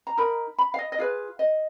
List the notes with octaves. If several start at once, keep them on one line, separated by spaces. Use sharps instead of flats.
A#5
D#4 A#4 B5
B5
F5
D#5
D#5
F4 G#4 B4 F5
D#5